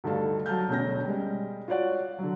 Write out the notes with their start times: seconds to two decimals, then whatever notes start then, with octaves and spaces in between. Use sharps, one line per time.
0.04 D2 G2 D#4 A4 F5
0.46 F#3 A5 F6 G6
0.69 E1 D2 C#4 G6 A#6
1.04 G3 G#3
1.68 F4 F#4 C#5 D5 F#5
2.19 D3 F#3